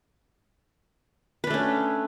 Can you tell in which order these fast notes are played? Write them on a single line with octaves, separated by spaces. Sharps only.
B4 D4 A3 C#4